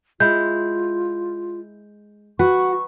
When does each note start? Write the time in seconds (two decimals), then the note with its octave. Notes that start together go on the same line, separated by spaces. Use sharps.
0.20 G#3 E4 F4 G6
2.39 F#4 B4 C#6